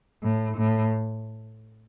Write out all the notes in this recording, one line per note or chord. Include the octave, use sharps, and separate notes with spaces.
A2
A2